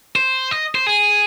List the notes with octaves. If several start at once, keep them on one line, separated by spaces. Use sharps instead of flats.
C5
D#5
C5
G#4